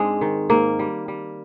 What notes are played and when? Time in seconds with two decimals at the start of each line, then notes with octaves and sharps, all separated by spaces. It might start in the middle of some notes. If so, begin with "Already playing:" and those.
Already playing: G#2 G#3 C4 D4
0.21 D#3
0.50 G#2 A#3
0.79 G3
1.08 G3